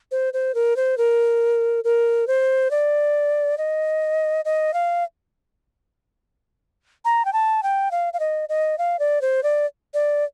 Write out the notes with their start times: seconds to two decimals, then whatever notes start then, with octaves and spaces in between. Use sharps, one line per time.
0.11 C5
0.33 C5
0.54 A#4
0.76 C5
0.98 A#4
1.84 A#4
2.27 C5
2.71 D5
3.58 D#5
4.45 D#5
4.74 F5
7.05 A#5
7.25 G5
7.33 A5
7.63 G5
7.91 F5
8.13 F5
8.20 D#5
8.49 D#5
8.78 F5
8.99 D5
9.21 C5
9.43 D5
9.94 D5